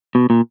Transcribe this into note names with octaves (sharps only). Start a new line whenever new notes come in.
B2
A#2